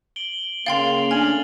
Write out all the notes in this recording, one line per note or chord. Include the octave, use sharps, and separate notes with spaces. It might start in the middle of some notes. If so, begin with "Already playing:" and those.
D7 F#7 G7
C#3 A#3 F5 G5 C6 A6 C7 F7
A3 D4 G#5 F6 G#6 F#7